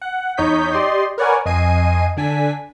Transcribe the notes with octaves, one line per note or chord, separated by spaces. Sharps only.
F#5
E2 D#4 C#5 D#5 G6 B6
G4 D5 D#5 C6
A#4 B4 C#5 D5 F#5 G#5
F2 D#5 G#5 C7 D#7
D3 D4 G#5 B6